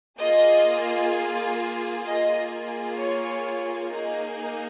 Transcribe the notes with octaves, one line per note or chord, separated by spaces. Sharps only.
A#3 F4 G#4 D#5
A#3 F4 G#4 D#5
C#5
A#3 D#4 G#4